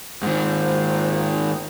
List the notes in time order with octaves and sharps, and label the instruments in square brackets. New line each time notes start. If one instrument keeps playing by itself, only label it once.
[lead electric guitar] G#2 D#3 [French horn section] A#3 F4 [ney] C5